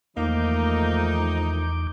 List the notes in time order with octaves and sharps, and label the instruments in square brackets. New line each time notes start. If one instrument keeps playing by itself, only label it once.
[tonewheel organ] E2 D6 G6 [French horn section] D#3 F3 A3 [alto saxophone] A#3 [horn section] D#4